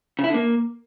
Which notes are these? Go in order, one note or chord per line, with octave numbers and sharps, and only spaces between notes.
C#3
E4
D3
A#3